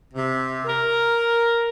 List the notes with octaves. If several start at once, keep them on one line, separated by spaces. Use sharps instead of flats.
C3
A#4